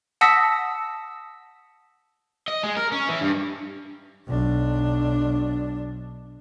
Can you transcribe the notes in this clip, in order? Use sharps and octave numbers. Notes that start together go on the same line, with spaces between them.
F#5 A5 D#6 E6 A#6 B6
D#5
G#3
A#4
C#4
E3
G2
B1 D4